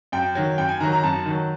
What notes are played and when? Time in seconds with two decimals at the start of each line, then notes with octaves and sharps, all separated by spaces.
0.12 F#2 G5
0.35 D#3 F#3
0.58 F#2 G5
0.69 G#5
0.80 D#3 F#3 A#5
0.92 A#5
1.03 F#2 A5
1.26 D#3 F#3